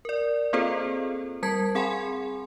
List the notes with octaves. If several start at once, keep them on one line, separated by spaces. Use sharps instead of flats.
A#4 D5
A#3 C4 F4 G#4 A4 C5
G3 A#4 A5 G#6 B6
C4 G#4 F#5 G#5 B5 C6